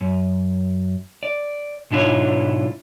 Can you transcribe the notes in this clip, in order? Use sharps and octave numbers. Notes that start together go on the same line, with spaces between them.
F#2
D5
B1 G#2 D4 E4 F4 C#5